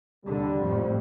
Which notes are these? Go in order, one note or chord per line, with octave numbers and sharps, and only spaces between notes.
D#2 D3 G3
A1 F2